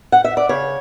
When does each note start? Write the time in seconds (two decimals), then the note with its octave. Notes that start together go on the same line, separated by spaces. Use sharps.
0.12 F#5
0.24 E5
0.37 D5
0.49 C#3 C#5